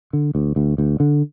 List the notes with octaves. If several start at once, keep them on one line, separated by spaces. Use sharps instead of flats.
D3
D2
D2
D2
D3